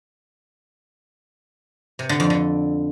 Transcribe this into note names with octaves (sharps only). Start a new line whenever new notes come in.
C3
D3
F2
D3